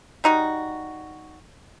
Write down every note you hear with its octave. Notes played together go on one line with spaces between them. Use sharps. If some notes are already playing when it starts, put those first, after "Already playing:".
G3 D#4 F#4